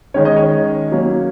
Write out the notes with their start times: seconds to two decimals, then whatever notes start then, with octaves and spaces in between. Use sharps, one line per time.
0.14 D#3 G#3 C#4 C#5
0.25 D#5
0.36 C#5
0.92 F#3 A#3 C#4